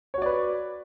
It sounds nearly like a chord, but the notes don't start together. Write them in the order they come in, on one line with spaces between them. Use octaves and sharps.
C#5 F#4 D5 B4